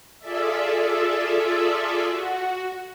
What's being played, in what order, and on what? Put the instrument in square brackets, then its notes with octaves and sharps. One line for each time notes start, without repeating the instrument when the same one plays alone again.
[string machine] F4 G#4 A4 D5 E5
F#4